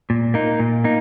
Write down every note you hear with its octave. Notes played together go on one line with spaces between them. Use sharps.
A#2
A#3 D#4
A#2
A#3 D#4